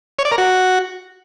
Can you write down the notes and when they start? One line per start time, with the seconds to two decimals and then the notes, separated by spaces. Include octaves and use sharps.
0.19 C#5
0.25 D5
0.32 A#4
0.38 F#4